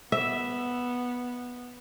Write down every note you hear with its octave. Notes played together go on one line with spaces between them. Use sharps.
B3 E5